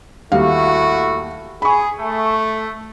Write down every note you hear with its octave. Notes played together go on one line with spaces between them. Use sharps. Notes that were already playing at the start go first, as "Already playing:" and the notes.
D#2 G3 A3 E4 F#4 F5
G#4 B5 C#6
A3